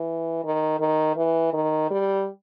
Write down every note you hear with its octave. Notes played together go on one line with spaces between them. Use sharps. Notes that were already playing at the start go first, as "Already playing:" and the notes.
Already playing: E3
D#3
D#3
E3
D#3
G3